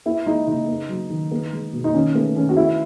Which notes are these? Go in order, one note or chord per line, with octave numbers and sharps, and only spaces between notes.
B3 E4
G#3 D#4
C#3 D#4
B3
F#3
D#3
B3
G#3
B2
D#4
D#3 C#4
A3 B3
D#3 C#4
F#4
B3 E4